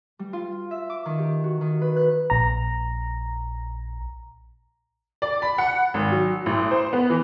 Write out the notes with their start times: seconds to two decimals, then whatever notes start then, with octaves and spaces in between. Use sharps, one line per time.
0.19 G3
0.33 F4
0.71 E5
0.90 D6
1.05 D#3
1.19 G4
1.44 F#4
1.61 D#3
1.81 B4
1.96 F#6
2.30 A#1 A#5
5.22 D5
5.42 B5
5.58 F#5
5.94 G#1
6.12 F#3
6.46 A1
6.71 C5
6.93 B3
7.10 E3